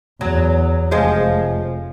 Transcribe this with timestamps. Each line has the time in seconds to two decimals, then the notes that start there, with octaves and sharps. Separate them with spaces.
0.21 E2 F#3
0.91 F1 F3 G#3